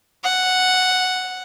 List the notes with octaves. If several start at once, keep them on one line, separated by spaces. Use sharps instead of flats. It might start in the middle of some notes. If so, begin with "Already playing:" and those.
F#5